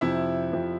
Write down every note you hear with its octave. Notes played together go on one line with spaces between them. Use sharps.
F2 C3 F3 E4 E5
F2 C3 F3